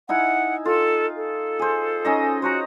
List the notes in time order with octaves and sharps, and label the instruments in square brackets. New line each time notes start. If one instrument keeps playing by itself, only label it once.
[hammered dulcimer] D#4 E4 G#5 [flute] F#5
[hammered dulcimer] F4 [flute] A4
[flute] A4
[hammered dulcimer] G#4 C5
C#4 D#4 D#5
[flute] F#4 [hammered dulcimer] C5 C#5 A#5